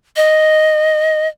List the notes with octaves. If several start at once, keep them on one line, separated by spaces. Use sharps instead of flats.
D#5